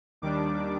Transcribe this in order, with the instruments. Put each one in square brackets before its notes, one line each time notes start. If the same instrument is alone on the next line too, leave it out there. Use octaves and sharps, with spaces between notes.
[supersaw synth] D#2 D#3 G3 D4 D6